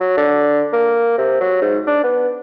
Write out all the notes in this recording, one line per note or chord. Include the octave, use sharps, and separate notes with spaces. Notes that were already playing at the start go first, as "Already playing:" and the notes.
F#3
D3
A#3
C3
F#3
G#2
D4
B3